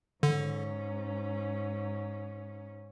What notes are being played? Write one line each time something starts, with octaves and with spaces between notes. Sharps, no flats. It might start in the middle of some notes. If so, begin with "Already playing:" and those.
G#2 D3 C#4